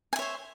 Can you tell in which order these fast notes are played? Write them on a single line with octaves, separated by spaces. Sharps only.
G#5 E5 C#5 C5